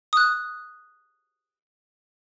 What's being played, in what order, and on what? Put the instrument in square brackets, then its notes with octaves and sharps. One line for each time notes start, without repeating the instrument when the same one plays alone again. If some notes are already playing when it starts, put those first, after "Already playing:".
[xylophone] D#6 F#6